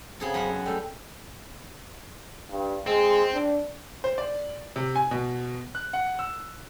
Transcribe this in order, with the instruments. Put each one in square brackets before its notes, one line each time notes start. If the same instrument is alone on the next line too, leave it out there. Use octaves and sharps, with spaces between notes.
[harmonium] C#3 C4 [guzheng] B3 G#4 A4
[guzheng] F#2 C#5 F#5
[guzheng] G3 A3 [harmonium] A4 G5
[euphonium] G2
[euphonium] G#3 [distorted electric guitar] C4
[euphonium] D4
[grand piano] C5
D5
C3
G#5
B2
F#6
F#5
E6